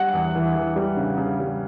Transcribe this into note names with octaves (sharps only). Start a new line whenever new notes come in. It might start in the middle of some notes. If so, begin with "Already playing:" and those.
Already playing: G3 F#5
E2
E3
E3
G3
C#3
C#3
G3